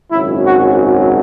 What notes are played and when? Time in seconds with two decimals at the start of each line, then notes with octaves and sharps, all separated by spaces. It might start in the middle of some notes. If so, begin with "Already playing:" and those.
0.10 G#1 F#2 C#3 F#3 E4
0.45 F#4